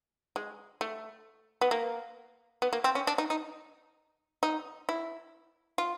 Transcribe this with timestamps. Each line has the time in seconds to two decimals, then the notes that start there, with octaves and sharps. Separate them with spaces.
0.36 G#3
0.81 A3
1.61 B3
1.71 A#3
2.62 B3
2.73 A#3
2.84 C4
2.95 C#4
3.07 D4
3.18 D#4
3.30 D#4
4.43 D#4
4.89 E4
5.78 F4